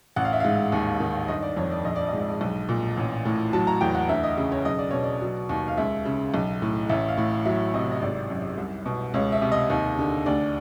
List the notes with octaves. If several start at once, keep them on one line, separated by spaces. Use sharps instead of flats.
A1 F#5
F5
E5
G#2 F5
D#2
D#3
G1 D#5
D5
F2 C#5
D5
A#1 D#5
D5
D#5
G#2
B1
A#2
A1
A2
F#3 A5
A#5
E2 G5
F#5
D2 E5
D#5
C#3
C#5
B1 D#5
D5
B2 C#5
D5
F#3
D#2
F5
C#2 E5
C#3
B1
A2
A1 E5
F5
A2
F#3 E5
C3 D#5
D#5
G#1 D5
F#2
C2
B2
C#2 C#5
E5
C3
D#5
D#2
D3
D2 D5